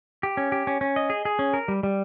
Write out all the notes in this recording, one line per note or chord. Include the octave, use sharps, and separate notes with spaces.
G4
C#4
G4
C#4
C#4
D#5
G#4
G#4
C#4
A#4
G3
G3